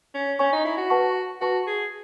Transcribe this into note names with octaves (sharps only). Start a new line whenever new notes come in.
C#4
C#4 C#5 G#5 C#6
D#4
E4
F#4
B4 F#5 A5 C#6
F#4 B4 F#5 A5 C#6
G#4